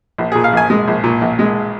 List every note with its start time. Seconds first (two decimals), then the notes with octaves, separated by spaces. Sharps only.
0.18 A#1
0.32 A#2 G#4
0.44 F5
0.52 A#1 G#5
0.70 G#3
0.88 A#1
1.04 A#2
1.21 A#1
1.39 G#3